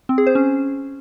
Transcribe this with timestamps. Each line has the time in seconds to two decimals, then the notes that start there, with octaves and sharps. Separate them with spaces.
0.09 C4
0.18 G#4
0.27 C5
0.35 C#4